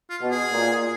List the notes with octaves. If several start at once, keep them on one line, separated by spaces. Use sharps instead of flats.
F4
B2
G#4
A#2